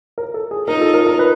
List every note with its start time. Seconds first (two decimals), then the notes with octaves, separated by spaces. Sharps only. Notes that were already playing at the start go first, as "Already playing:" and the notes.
0.18 A#4
0.34 A4
0.51 G#4
0.68 D#4 F4 A#4
0.81 A4
0.94 A#4
1.07 A#4
1.19 B4